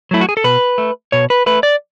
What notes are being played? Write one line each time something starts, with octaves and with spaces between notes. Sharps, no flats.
F#3 A3 E4
F#4
G#4
A4
B2 B4
A3
B2 C#5
B4
A3 B4
D5